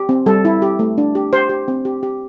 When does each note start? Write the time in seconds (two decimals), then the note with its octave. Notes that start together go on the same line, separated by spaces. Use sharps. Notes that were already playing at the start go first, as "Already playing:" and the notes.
Already playing: G4
0.09 C4
0.26 G3 A4
0.45 E4
0.62 G4
0.79 A3
0.98 D4
1.15 G4
1.32 G4 C5
1.49 G4
1.68 C4
1.85 G4
2.03 G4